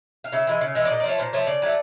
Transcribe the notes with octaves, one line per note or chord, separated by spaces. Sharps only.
F5
C#3 E5
E3 G#3
C#3
E3 G#3
D5
A#2 D#5
D5
F3 A3 C#5
A#2 C5
F3 A3 C#5
C#3 D5
F#3 A3